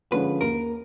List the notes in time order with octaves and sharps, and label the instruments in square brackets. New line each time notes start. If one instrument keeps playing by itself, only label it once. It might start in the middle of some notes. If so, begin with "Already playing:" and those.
[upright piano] D3 F3 G#3 C#4 [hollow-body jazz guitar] B4
[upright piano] D#2 [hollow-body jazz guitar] A#4